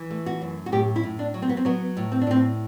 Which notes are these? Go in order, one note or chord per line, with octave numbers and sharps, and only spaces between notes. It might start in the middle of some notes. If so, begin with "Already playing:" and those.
Already playing: E3
A3
F#4
F#2
F#4
A2 G4
E4
A2
D4
F#3
C4
B3
C4
F#3 B3
A2
C4
D4
A2 C4